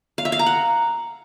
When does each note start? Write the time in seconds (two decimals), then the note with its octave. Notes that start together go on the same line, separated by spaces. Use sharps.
0.18 F5
0.25 E5
0.32 F5
0.39 A#5
0.46 F#5